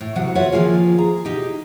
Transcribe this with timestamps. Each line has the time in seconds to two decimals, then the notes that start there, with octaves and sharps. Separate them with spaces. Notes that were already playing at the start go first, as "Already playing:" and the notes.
0.01 A2
0.15 D2 C3 F#3 F#5
0.35 F4 F#4 B4 C#5 E5 F#5
0.52 D#3 F3 A3 A#3 F4 G#4
0.98 G#4 A#5
1.25 B2 D#4 G4